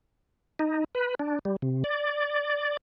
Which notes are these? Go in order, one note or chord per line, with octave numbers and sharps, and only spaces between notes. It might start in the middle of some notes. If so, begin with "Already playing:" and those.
D#4
B4
D4
G3
C3
D5